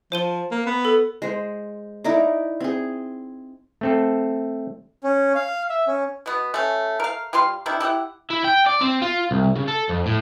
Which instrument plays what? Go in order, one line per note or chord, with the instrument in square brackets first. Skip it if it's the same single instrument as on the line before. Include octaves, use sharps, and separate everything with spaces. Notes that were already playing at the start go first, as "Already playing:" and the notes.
[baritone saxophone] F3 [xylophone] C5 D#7 G7
[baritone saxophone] A#3
B3
[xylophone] A4
[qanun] G#3 C5
D#4 E4 A#4 D5
C4 G#4
[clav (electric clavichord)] A3 C4 A4
[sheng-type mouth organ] C#4
F5
E5
C#4
[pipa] B2 B3
A3 C#4
A#4 F5
G3 F4 F5 C6
C3 D#3 D4 E4
E4 G4 A4 F#5
[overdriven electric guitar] E4
G5
D5
C4
F4
C2
C#3
A4
F2
A2